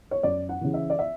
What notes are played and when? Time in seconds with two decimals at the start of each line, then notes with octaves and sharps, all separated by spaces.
0.11 C#5
0.23 F#2 D5
0.49 F#5
0.61 C#3 E3
0.74 E5
0.90 D5
0.99 E5